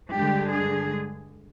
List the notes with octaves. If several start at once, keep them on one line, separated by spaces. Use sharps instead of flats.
G2 D3 G#3 D4 G4
G#4